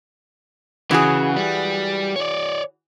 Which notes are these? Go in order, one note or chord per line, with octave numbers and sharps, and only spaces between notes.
C#3 E3 F#4 G#4
G3
C#5 D5